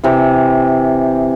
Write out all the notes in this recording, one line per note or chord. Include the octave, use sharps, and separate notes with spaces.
C3 E3